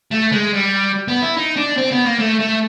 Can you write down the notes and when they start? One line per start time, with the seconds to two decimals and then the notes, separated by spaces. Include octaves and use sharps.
0.11 A3
0.32 G#3
0.53 G3
1.08 B3
1.22 E4
1.37 D#4
1.57 D4
1.77 C4
1.91 B3
2.05 A#3
2.19 A3
2.40 A3